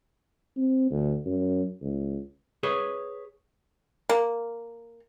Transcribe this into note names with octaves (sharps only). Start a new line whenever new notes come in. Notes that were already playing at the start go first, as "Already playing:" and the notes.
C4
D2
F#2
C#2
G#4 B4 C#5
A#3